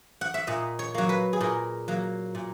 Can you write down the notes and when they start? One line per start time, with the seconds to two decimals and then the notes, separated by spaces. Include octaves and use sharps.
0.21 F#5
0.34 E5
0.47 A#2 D#5
0.79 C#5
0.95 F#3 A#3
1.09 B4
1.33 G#4
1.41 A#2 A#4
1.88 F#3 A#3
2.35 A#2